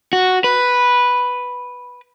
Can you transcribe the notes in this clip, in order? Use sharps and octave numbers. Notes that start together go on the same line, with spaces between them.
F#4
B4